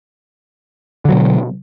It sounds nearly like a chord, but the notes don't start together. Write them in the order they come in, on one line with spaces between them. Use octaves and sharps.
D3 F#3 B2